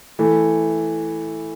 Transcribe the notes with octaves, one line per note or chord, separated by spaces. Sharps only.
E3 A3